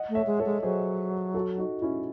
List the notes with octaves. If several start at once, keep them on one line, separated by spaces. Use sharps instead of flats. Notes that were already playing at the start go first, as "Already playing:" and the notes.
Already playing: D#5 F#5
A3
C#5 E5
G#3
A4 C#5
G#3
F#3 G#4 C5
F#4 A4
D#4 F#4
C#4 E4